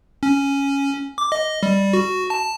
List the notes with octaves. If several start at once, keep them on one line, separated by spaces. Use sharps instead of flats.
C#4
D6
D#5
G3
F#4
A5